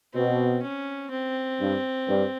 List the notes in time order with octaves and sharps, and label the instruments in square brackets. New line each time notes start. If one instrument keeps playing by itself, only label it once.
[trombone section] B2 [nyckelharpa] C4
[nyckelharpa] C#4
C4
[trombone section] G2
G2